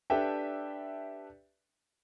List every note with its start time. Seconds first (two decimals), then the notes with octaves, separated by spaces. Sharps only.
0.10 D4 G4 A4 B4 E5 G5